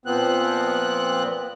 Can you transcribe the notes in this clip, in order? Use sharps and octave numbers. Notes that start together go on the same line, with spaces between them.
A#2 F3 B3 C4 F#6